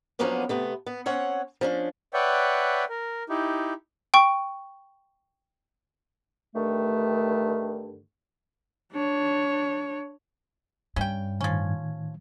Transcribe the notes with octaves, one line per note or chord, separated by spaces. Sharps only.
F3 F#3 A#3 B3 C#4 D4
C3 A3 B3
B3
C4 C#4 C#5 F#5
F3 C#4 D4
B4 C#5 D5 E5 F#5 G5
A#4
D#4 E4 G4
G5 C#6
G2 D3 D#3 A3
D4 C#5
G2 C#4 G5
A2 D#3 F3 C#4 G#6